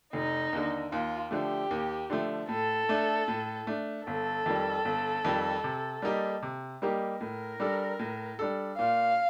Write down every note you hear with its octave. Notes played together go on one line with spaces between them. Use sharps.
F1 D#4
D#2 D3
D#2 F4
D3 F3 A3 G4
D#2
D3 F3 A3
A2 A4
A3 D4
A2
A3 D4
G1 A4
F2 D#3 G3
G1
F2 D#3 G3
C3
G3 A#3 D#4 G4
C3
G3 A#3 D#4 G4
A2 A#4
G3 D4 A4
A2
G3 D4 A4
A#2 F5